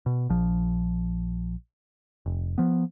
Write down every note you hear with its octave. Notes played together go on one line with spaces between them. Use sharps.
B2
A#1 F3
F1
F3 B3